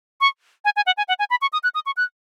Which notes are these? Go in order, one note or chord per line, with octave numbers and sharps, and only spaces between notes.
C#6
G#5
G#5
F#5
G#5
F#5
G#5
B5
C#6
D#6
F#6
D#6
C#6
F#6